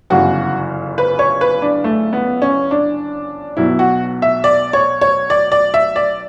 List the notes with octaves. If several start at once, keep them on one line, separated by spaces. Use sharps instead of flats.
G1 F#2 C#3 E3 F#4
B4
C#5
B4
D4
A3
B3
C#4
D4
B1 B2 F#3 E4
F#4
E5
D5
C#5
C#5
D5
D5
E5
D5